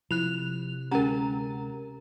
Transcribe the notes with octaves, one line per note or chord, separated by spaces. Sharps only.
C3 F3 E4 F#6 F7
D2 G#3 C#4 G4 A#4 F#5 A#5